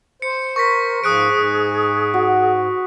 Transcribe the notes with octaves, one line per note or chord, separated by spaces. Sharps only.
C5 C#7
A#4 C#6 A#6 B6
G#2 F3 G#4 D#6 F#6 D7
G#2
F#4